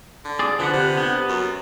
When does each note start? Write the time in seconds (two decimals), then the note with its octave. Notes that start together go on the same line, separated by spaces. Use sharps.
0.25 D3
0.39 G#4 D5
0.59 D3 F3 B4 F#5
0.73 C3
0.97 B3
1.29 F#2